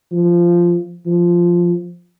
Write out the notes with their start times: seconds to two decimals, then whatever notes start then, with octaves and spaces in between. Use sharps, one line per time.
0.11 F3
1.06 F3